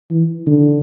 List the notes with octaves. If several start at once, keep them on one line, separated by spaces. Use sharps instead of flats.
E3
D3